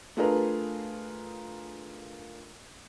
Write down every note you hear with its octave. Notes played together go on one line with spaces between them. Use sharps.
A3 D4 F4 G#4 A#4 B4